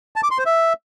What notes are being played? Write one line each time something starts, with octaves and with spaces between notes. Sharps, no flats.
A5
D6
C6
C5
E5